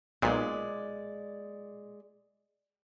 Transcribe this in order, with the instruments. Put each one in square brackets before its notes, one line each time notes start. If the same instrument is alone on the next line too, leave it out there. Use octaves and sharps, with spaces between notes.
[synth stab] B1 A#2 [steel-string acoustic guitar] G#3 D5